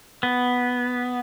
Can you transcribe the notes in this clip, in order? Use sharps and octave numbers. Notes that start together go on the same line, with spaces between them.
B3